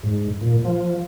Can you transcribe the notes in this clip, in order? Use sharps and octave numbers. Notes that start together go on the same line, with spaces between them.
G#2
A#2
F3